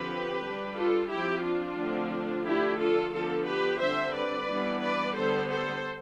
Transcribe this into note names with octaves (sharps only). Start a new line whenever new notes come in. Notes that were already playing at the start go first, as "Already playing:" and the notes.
Already playing: D3 F3 C4 G4 B4
G3 D4
F4 A4
F3 C4 E4 G4
D4 F4
D3 F3 A3 C4
D3 F3 A3 D4 E4 G4
F4 A4
D3 F3 B3 D4 F4 A4
G4 B4
D3 G3 C4 C5 E5
B4 D5
E3 G3 B3 D4
B4 D5
D3 G3 B3 A4 C5
A4 C5